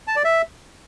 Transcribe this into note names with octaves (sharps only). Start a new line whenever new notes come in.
A5
D5
E5